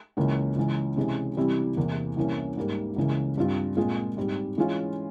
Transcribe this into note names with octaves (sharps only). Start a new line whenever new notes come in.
C#2 C#3 E3 A#3 C#4
C#2 C#3 E3
C3 E3 G#3 C#4
C3 E3 G3 C4 E4
E2 C3 E3 A#3
C2 C3 E3 A#3 C#4
G#2 G3 A#3
C#2 C#3 E3 A#3
G2 G3 C4 F4
A#2 G#3 C4 F4 G#4
G#2 G3 C4
E3 G#3 C#4 F4